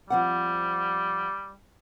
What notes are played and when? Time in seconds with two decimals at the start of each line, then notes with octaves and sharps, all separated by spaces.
0.10 F3 G3 C4 F#5